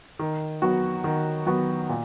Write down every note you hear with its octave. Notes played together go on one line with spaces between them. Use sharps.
D#3
F#3 B3 F#4
D#3
F#3 B3 F#4
A#2